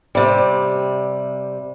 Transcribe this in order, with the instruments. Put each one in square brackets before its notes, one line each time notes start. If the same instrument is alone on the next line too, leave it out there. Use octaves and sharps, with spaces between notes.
[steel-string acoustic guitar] C3 G3